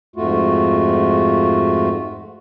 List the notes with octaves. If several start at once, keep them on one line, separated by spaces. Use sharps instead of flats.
F2 G#2 A3 F4 F#4